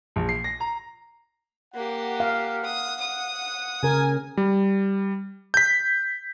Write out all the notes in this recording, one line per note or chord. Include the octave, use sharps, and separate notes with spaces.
A#1
C7
A#6
A#5
A#3 G4 F#5
F5
D#6
D#6
C#3 A#4 G#5
G3
G6 B6